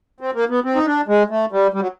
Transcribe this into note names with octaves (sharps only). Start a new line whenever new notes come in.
C4
A#3
B3
C4
D#4
D4
G#3
A3
G3
G3
F#3